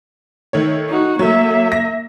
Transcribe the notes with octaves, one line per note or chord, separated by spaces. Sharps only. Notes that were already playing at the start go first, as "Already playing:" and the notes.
D#3 A3 C#5
D#4 F#4
F#3 A3 A#3 E5
A#6